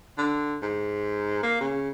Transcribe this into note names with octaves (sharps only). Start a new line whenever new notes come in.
D3
G#2
A#3
C#3